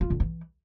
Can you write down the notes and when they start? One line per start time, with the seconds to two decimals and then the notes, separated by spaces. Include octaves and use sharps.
0.01 F4
0.10 D3
0.20 E3